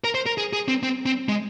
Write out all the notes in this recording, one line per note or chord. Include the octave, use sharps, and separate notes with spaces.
A#4
C5
A#4
G#4
G#4
C4
C4
C4
G#3